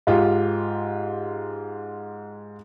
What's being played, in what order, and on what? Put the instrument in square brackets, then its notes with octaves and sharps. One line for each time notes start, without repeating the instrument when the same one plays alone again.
[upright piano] G#2 F4 G4